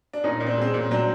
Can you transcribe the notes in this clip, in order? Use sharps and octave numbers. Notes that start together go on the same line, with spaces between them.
D4
A#2 C#4 D#4
A#2
C4 D4
G#3 C4
C#4
A#2
F#3 C4 D4